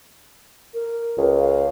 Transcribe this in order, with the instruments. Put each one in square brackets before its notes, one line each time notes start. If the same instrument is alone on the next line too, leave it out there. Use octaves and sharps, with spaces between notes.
[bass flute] A#4
[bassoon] C#2
[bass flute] F5